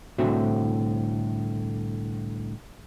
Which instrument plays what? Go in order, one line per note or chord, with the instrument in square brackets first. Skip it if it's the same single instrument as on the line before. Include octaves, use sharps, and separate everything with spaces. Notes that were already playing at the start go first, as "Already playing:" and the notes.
[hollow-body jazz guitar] C2 A2 D3 C4 F#4 E5